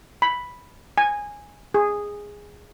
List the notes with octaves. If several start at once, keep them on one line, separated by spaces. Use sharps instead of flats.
B5
G#5
G#4